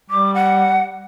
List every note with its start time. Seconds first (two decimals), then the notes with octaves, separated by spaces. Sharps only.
0.10 G3 D6
0.34 F#5